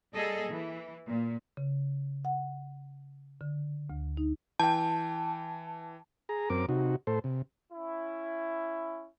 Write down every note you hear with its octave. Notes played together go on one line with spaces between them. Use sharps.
G3 A#3 G#4 A4 D#5
E3
A#2
C#3
F#5
D3
D2
D#4
E3 G5 A5
G#4 A#5
F#2 C4 A#4 D6
C3 D#4 F#4
A2 A4 C5
C3
C#4 E4